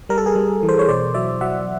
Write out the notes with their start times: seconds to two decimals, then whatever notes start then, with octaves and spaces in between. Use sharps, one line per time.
0.09 G3 A#4
0.18 A4
0.26 G#4 A#4
0.35 G3
0.63 E3
0.69 C5
0.79 C#5
0.88 B2 C5 D5
1.14 F#3 D5 E5
1.41 F#3 E5 F#5